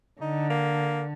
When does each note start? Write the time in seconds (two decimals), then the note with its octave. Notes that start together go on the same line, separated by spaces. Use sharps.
0.21 D3 D#4
0.50 A#3